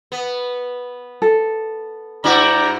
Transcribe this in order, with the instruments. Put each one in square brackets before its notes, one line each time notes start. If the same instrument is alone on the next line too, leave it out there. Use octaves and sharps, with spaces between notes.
[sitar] B3
[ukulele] A4
[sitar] G2 E4 F#4 [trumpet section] D5 G5 A#5